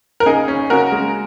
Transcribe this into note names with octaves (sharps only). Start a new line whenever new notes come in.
A#4
C#3 D#4 G#4
C#4
C#3 F#4 A#4
G#3